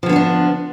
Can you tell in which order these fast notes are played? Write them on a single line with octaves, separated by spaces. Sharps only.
F3 D3 B3 C#4 D4